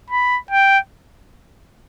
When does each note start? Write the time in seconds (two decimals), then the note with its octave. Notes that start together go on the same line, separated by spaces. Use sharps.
0.10 B5
0.51 G5